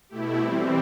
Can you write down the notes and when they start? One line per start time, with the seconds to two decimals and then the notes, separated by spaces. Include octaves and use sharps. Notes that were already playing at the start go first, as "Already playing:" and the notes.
0.09 B2 A3 E4 G4
0.38 E3 G3 C4 G4